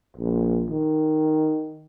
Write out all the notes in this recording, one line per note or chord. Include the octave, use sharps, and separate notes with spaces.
A#1
D#3